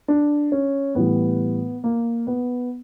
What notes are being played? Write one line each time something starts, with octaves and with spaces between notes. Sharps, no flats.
D4
C#4
A2 E3 G3 B3
A#3
B3